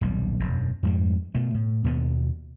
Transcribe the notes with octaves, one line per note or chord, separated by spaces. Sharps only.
D#1 B1 G3
E1 F#2
F2 G#2 G3
B2 A3
A2
D#2 B2 B3